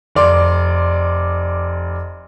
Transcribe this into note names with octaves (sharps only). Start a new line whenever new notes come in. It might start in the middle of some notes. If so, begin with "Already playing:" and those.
F1 D5 C6